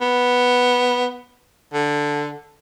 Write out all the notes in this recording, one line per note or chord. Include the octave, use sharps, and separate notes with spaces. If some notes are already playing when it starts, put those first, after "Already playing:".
B3
D3